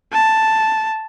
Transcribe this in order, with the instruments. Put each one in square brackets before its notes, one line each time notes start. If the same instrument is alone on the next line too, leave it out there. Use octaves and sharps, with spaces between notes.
[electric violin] A5